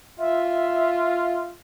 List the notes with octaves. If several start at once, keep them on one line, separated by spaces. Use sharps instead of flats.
F4 E5